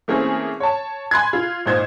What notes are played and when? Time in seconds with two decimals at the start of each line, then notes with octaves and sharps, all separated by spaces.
0.08 E3 A3 A#3 C4 C#4 G#4
0.60 C#5 A5
1.11 G#5 B5 C6 F#6 G#6
1.33 F4
1.66 G#1 A#2 D#4 C5 C6 G#6